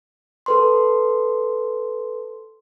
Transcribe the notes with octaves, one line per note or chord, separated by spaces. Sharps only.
A4 B4 C6